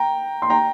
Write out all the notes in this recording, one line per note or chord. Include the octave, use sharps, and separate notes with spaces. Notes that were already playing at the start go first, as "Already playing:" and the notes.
Already playing: G5 A#5
C6
G5 A#5